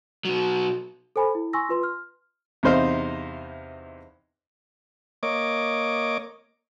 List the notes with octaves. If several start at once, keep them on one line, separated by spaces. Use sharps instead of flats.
B2 F#3
A4 C5 G#5 B5
E4
G#5 C6 C#6 E6 A#6
F4 B4 C6
F6
E2 C3 D#4 C5 D#5 F5
A#3 C#5 D#5 D6